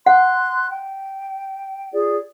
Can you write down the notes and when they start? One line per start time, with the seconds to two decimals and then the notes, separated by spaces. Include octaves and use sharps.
0.06 F#5 C6 F#6
0.69 G5
1.92 F4 G#4 D5